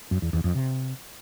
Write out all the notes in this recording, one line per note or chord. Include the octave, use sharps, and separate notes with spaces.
F#2
E2
E2
F2
C3